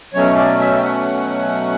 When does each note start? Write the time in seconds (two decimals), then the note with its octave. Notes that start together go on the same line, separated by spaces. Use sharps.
0.14 B2 F#3 A3 C#4 C#5
0.37 D5
0.60 E5
0.77 G5
0.83 F#5